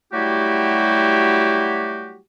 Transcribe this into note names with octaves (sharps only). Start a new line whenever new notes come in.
F#3 G3 A3 E4 F#4 G4